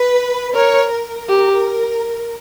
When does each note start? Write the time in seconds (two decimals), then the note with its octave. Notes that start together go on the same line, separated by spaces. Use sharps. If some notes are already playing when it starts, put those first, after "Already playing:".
Already playing: B4
0.55 A#4 C#5
0.92 A#4
1.29 G4